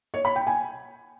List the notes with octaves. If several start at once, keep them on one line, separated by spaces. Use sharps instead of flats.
C#5
B5
G5
G#5